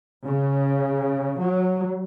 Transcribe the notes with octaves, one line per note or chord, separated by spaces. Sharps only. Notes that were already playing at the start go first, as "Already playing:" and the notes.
C#3
F#3